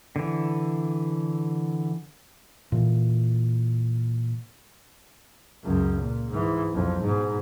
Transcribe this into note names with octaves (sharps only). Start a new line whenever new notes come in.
D3 E3
A#2 E3
C#2 F#2
A#2
G#2 E3
B1 F2
G#2 B2